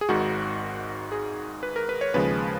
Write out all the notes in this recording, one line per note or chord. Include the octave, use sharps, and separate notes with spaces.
G#4
G#1 G#2 D#3 F#4
G#4
B4
A#4
B4
C#5
D#2 C#3 F3 G#3 B4